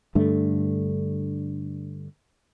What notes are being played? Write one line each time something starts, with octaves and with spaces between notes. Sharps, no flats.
G2 D3 A3